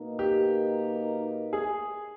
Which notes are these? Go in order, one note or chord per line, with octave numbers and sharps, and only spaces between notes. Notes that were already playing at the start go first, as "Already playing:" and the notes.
Already playing: B2 A#3 D#4 A#4
G4
G#4